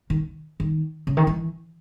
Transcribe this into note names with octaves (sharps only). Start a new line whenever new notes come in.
D#3
D#3
C#3
D#3
E3